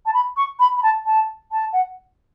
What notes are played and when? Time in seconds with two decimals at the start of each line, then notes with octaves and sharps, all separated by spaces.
0.06 A5
0.14 B5
0.37 C#6
0.59 B5
0.77 B5
0.83 A5
1.06 A5
1.52 A5
1.73 F#5